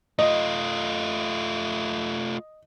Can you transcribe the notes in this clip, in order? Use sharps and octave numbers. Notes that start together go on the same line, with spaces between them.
A3 F4 D#5